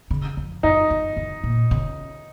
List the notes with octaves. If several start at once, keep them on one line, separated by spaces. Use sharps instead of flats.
C#3
F2
F#2 D#4
F#2
F#2
A#2
C#3